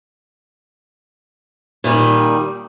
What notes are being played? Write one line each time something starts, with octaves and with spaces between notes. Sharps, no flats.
A#2 D#3 G3